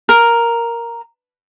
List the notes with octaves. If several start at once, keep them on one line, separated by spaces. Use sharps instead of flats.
A#4